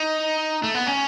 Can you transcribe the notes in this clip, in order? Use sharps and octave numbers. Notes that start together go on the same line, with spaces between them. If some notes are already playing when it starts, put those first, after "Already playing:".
Already playing: D#4
A3
B3
C#4